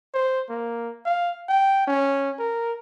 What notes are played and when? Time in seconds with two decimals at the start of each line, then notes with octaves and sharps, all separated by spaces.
0.14 C5
0.50 A#3
1.05 F5
1.49 G5
1.87 C#4
2.39 A#4